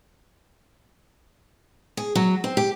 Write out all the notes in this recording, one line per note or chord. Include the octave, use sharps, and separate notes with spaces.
G#4
F#3
C4
G4